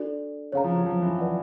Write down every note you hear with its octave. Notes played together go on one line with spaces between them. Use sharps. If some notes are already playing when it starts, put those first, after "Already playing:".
Already playing: D4 F#4 A4 D5
C#3 C#5 F5 A#5
F3
F#3
F3
E3
B4 D5 F#5